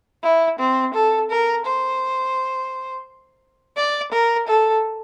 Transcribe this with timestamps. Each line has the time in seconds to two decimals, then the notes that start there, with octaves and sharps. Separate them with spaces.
0.23 E4
0.59 C4
0.94 A4
1.30 A#4
1.66 C5
3.77 D5
4.12 A#4
4.48 A4